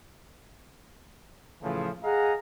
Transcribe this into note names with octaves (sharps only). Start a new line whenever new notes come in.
A2 C#3 E3 F3
G#4 D#5 F5 F#5 G#5 A#5